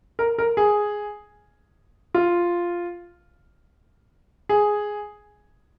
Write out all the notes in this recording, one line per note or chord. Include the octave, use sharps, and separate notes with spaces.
A#4
A#4
G#4
F4
G#4